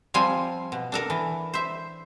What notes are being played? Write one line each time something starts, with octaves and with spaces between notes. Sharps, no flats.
F3 G3 C4 F4 G#5
B2
D4 A4 A#4
E3
C5 E5